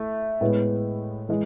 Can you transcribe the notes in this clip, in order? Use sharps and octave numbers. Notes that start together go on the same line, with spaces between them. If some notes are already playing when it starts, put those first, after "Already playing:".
Already playing: A3 E4
A2 G#3 B3
E3 G#3